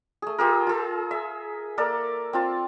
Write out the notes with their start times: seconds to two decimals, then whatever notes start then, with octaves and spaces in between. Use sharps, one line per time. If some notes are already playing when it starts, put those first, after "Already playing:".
0.22 A3 G#4
0.38 F4 G4 G#4 A#4
0.67 F4 G#4
1.11 E5
1.78 A#3 A4 A#4 D5
2.33 C4 F4 A5